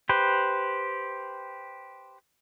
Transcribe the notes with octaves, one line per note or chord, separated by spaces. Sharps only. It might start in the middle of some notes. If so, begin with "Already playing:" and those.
G4 B4 C5